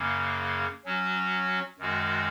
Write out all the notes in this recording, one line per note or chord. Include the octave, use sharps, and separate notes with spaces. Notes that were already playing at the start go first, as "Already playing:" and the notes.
Already playing: F#2 C#3 A#3
F#3 C#4 F#4
F#2 D#3 G#3 F#4